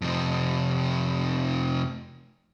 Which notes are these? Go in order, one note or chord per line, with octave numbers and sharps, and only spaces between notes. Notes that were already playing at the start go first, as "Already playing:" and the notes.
F2 C3